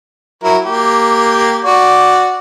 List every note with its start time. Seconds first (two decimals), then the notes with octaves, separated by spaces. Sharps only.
0.44 F#3 E4 A#4
0.64 A#3 G4
1.65 F#4 D5